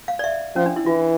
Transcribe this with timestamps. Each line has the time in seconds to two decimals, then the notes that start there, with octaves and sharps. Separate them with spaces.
0.08 F5
0.19 D5
0.24 E5
0.56 F3 C#4
0.66 D4
0.76 E4
0.86 E3 F4